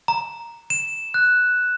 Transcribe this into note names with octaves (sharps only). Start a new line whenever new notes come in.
A#5
E7
F#6